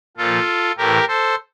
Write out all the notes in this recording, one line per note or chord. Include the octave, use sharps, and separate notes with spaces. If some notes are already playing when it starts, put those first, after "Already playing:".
A#2 F3 F4 A4
A2 E3 G4 A#4
A4 C5